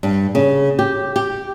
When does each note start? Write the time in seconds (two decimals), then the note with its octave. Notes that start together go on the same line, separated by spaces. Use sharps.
0.03 G2
0.35 C#3
0.79 G4
1.16 G4